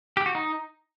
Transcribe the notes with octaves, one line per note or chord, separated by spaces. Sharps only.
G4
F#4
D#4